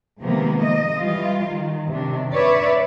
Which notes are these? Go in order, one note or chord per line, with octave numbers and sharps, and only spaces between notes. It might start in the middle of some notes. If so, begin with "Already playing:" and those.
C3 D#3 F3 G#3 A#3 B3
D#5
E3 G3 F4
D#3
C3 D#3 D4
B4 C#5 D5 E5